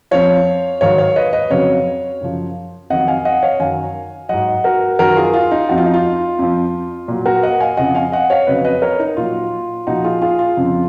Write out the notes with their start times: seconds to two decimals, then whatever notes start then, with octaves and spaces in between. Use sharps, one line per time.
0.11 F2 F3 C#5 F5
0.81 G#2 D#3 F#3 C#5 F5
0.98 C#5 F5
1.16 B4 D#5
1.33 B4 D#5
1.50 F2 C#3 F#3 C#5 F5
2.21 F#2 C#3 F3
2.90 F2 D#3 F#3 D#5 F#5
3.08 F5 G#5
3.25 D#5 F#5
3.43 C#5 F5
3.60 F#2 D#3 F#3 F5 G#5
4.29 G#2 F#3 D#5 F#5
4.64 F#4 A#4
4.99 F#2 D#3 F#3 F#4 A#4
5.16 F4 G#4
5.34 F4
5.51 D#4
5.69 F2 F3 F#4
5.78 F4
5.86 D#4
5.94 F4
6.39 F2 F3
7.08 A#2 F#3
7.26 F#4 A#4
7.43 D#5 F#5
7.60 F5 G#5
7.77 F2 C#3 F3 D#5 F#5
7.95 F5 G#5
8.12 D#5 F#5
8.30 C#5 F5
8.47 F2 C#3 F#3 B4 D#5
8.64 B4 D#5
8.82 A#4 C#5
8.99 D#4
9.17 A#2 F#3 F4
9.87 A#2 F3 D#4 F#4
10.04 F4 G#4
10.22 F4 G#4
10.39 F4
10.57 F2 C#3 F3